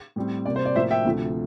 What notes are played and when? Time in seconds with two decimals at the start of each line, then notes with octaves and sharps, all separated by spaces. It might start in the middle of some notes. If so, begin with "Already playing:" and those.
0.16 A2 G3 C4
0.45 C3 G3 A#3 D5
0.56 C5
0.66 D5
0.76 A2 F3 A#3 C5 E5
0.91 E5 G5
1.05 D2 C3 F3 A3